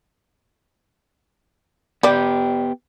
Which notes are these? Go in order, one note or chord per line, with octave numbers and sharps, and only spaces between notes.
G3 B3 G4 D5